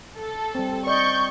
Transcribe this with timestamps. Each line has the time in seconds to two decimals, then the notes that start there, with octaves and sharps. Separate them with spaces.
0.18 A4
0.55 G3 C4
0.87 D5 D#5 C#6 G6